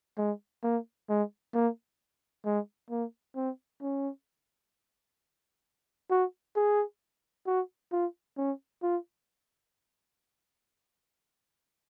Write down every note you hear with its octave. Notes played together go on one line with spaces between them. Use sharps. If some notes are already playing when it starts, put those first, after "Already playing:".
G#3
A#3
G#3
A#3
G#3
A#3
C4
C#4
F#4
G#4
F#4
F4
C#4
F4